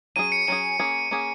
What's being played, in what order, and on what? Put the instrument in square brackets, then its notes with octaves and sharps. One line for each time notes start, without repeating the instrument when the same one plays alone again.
[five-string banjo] F#3 C#4 G#4 [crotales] D#7
[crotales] C#7
[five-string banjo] F#3 C#4 G#4 [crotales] D#7
[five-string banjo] A#3 C#4 G#4
A#3 C#4 G#4